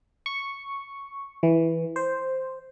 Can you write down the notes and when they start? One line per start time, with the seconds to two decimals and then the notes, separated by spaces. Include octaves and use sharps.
0.26 C#6
1.43 E3
1.96 C5